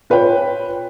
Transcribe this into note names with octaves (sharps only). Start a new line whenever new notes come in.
F4 B4 C#5 G5